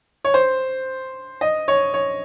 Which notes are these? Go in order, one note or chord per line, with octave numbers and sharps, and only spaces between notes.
C#5
C5
D#5
C#5
C#5